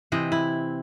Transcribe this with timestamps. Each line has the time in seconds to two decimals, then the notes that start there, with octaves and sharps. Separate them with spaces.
0.12 C3 E3 C4 D#5
0.32 E4